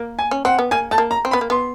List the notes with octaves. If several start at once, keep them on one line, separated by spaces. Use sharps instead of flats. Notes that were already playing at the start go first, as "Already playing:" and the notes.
Already playing: A#3
G#5
C#4
C4 F#5
B3
A#3 G#5
A3 A5
A#3
A#5
C4
B3 B5
A#3
B3 C6